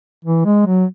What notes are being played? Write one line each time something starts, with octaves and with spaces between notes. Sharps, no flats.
E3
G#3
F#3